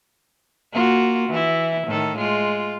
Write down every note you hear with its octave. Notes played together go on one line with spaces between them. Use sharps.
A#3 F4 F#4
E3 E4
A2 D#3 A4
G#3 F4